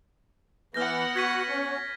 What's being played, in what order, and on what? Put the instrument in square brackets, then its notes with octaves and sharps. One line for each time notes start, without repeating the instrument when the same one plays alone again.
[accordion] E3 [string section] B3 F#5 [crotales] F6 G6 A#6
[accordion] F#4 [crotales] G#6 B6 D#7
[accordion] C#4